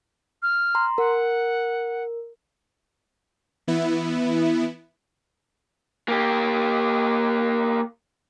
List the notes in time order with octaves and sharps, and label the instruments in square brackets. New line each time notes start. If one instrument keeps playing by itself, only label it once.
[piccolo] F6
[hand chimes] A#5 C6
[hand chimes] A#4 [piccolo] F#5
[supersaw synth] E3 B3 E4
[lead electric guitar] A#3 G4